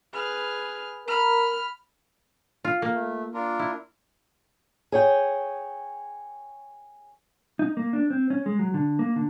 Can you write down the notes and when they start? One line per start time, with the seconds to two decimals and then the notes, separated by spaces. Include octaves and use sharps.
0.13 G#4 B4 F6
1.07 A#4 B5 F6
2.64 F4
2.82 A#3
2.94 A3
3.34 D4 F4 A#4
3.59 E4
4.92 G#4 C#5 G5
7.59 D#4
7.77 A#3
7.93 D4
8.10 C4
8.30 C#4
8.46 G#3
8.59 F#3
8.74 D3
8.99 A#3
9.16 D3